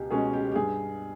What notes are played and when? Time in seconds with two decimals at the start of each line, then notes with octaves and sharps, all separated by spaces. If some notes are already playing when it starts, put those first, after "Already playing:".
Already playing: C#2 B2 G4 G#4
0.10 B2 G#3 C#4 G#4
0.33 G4
0.52 G4
0.56 G2 G#4